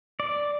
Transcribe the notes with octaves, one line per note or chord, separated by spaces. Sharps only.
D5